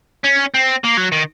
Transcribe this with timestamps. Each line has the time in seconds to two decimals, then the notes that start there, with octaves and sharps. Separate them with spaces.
0.24 C#4
0.54 C4
0.84 A#3
0.97 F#3
1.12 D#3